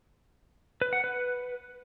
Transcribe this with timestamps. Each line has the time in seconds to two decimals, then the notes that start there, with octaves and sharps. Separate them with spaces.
0.81 B4
0.93 F#5
1.04 B4